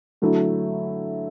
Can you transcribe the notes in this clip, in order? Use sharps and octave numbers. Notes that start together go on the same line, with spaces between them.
D3 F#3 A3 E4